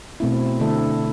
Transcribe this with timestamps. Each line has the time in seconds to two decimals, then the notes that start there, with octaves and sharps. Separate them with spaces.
0.20 B2 A3 C4 E4
0.60 D3 A3 E4 A4